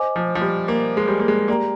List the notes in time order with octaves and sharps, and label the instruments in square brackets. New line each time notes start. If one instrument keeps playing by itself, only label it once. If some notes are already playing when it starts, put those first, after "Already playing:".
Already playing: [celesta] C5 D#5 G#5 D6
[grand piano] F3
F3
G3
A#3
G#3
G3
A#3
G#3
[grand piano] A#3 [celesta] G4 D5 G5 A#5